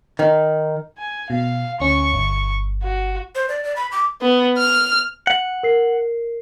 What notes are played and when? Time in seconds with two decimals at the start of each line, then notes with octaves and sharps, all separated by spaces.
0.19 D#3
0.98 G#5
1.30 B2 F5
1.80 D2 C#4 C#6
2.13 G1
2.83 F#4
3.35 C5
3.49 D5
3.64 D5
3.76 B5
3.92 D6
4.21 B3
4.58 F6
5.27 F#5
5.63 A#4 C7